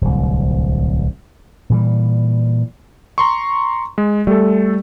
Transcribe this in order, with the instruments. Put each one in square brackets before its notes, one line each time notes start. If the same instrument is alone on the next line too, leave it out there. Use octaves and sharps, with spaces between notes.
[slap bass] D1 C2
A#2 E3 G3
[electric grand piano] A#5 C6 C#6
G#3
[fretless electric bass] G3 [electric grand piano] A3 A4